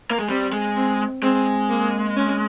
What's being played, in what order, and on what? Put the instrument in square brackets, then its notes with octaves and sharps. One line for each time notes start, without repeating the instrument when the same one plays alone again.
[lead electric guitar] A#3
G#3
[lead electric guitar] G3 [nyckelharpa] C4
[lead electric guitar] G#3
[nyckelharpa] C4
[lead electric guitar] G#3 [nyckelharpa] C4
[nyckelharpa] A#3
C#4